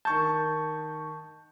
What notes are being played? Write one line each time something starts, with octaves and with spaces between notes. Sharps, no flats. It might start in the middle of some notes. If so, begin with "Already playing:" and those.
D#3 A5 C#6 G6